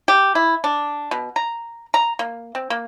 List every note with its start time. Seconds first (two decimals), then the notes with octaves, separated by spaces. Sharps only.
0.08 G4
0.35 E4
0.64 D4
1.11 B2
1.36 A#5
1.94 A#5
2.19 A#3
2.55 C4
2.70 A#3